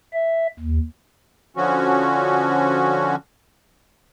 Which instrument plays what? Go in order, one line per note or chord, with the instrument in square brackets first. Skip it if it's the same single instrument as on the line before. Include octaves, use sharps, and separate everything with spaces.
[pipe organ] E5
D#2
[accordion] D3 F3 C#4 F#4